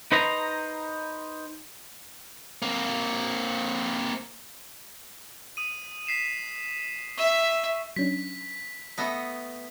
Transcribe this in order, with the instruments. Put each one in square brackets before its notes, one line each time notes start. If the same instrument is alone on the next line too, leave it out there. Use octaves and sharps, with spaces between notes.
[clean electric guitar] D#4 B4 C5 D#5 A#5
[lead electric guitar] A#3 C4
[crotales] D#6 D#7
B6 C7 E7
[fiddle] E5 [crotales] C#6
[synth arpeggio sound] F#3 C#4 D4 [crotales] B6
[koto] A3 B3 D#5